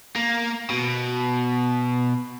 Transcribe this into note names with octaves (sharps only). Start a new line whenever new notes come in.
A#3
B2